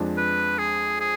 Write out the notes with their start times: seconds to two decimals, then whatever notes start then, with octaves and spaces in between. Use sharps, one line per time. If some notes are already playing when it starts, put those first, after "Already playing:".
Already playing: F2 F3 G#3 D4
0.17 B4
0.58 G#4
1.00 G#4